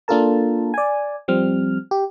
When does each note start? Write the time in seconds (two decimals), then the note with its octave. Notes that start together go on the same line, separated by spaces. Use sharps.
0.08 A#3 D4 F4 A4 A#4 A5
0.74 D5 G#5
1.28 F3 G3 C4 F6
1.91 G4